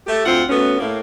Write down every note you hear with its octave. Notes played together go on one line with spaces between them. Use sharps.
A3 G4
D2 C4 F4 F#5
A3 B3 C#4 F#4
A2 A#3